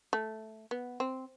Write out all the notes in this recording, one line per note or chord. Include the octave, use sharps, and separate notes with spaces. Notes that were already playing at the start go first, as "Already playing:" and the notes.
A3
B3
C4